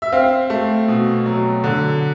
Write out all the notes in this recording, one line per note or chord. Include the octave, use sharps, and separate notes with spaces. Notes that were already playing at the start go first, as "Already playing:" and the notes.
E5
C4 F5
A3
B2
F#3
D3